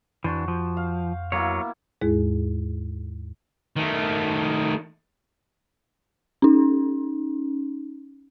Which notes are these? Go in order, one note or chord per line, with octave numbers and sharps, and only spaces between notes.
F2 E3 D4 F#4 C5
F3
F5
B2 F#3 A#3 E4 C#5
D#2 G#2 G#3 E4 G#4
D#3 A3
C#4 D#4